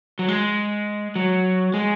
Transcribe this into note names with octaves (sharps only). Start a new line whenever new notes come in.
F#3
G#3
F#3
G#3